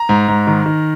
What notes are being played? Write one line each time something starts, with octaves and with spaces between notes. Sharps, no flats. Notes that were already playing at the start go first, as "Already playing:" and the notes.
Already playing: A#5
G#2
G#2
D#3
D#3